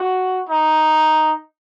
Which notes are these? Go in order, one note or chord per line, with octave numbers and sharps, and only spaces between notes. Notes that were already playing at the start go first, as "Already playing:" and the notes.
Already playing: F#4
D#4